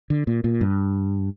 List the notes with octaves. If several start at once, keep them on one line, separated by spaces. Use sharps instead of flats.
D3
A#2
A#2
G2